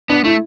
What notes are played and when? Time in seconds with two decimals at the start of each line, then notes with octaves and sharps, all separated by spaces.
0.09 B3 D4
0.24 A3 E4